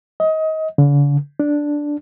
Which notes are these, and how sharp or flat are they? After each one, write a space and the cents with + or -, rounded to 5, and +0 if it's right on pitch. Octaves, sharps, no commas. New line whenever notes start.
D#5 +25
D3 -45
D4 +0